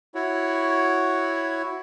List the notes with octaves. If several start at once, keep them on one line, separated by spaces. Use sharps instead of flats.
E4 F#4 C#5